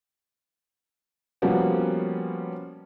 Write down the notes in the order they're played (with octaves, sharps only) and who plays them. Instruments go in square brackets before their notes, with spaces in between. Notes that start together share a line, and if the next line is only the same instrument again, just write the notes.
[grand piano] F3 G3 A#3 B3 C#4 F#4